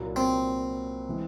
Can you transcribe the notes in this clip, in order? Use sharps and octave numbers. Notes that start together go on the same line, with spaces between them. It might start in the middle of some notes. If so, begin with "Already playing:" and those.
Already playing: C2 A#2 F#3 A#3
C4
E3 G#3